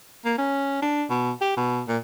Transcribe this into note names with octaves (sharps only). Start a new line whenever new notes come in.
A#3
C#4
D4
B2
G4
B2
A#2